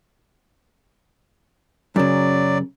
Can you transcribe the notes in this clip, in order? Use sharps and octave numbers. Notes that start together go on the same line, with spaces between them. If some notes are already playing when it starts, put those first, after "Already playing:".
F#2 C#3 F#3 D5